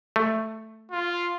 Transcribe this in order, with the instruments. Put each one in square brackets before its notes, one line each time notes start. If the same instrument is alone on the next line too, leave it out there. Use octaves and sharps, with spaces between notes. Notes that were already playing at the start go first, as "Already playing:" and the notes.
[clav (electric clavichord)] A3
[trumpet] F4